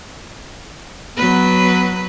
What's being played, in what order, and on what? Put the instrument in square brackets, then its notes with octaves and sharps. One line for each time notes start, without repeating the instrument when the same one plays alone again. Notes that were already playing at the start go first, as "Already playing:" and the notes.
[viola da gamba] F#3 B4 [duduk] B3